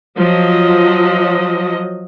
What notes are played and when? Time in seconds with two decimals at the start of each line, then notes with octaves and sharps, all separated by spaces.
0.17 F3 F#3 D#5